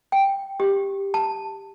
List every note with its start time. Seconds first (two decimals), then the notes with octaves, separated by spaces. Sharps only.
0.12 G5
0.60 G4
1.14 A5